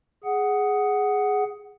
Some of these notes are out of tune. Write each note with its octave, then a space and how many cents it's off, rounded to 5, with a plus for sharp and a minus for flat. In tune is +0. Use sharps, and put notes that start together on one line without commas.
G#4 +0 F#5 +5